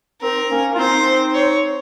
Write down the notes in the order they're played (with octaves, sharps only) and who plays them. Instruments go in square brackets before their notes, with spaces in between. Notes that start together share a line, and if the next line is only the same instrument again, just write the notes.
[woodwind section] C4 D#4 [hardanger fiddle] A#4
[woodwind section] A#3 C#4
F4
[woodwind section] C4 D#4 [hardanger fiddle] C5
[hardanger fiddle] C#5